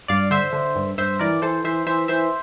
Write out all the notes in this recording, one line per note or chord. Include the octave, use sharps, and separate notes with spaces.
G2 D5 F5
D3 C5 E5
D3
G2
G2 C5 E5
E3 A#4 D5
E3 A4 C5
E3 C5 E5
E3 C5 E5
E3 C5 E5